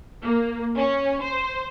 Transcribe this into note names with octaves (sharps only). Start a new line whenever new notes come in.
A#3
C#4
C5